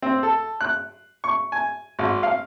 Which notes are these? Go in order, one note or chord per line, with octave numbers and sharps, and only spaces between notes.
C4
A4
F#6
C#6
G#5
G#1
F5